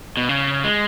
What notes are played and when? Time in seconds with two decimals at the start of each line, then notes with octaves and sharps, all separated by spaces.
0.17 B2
0.29 C#3
0.64 G#3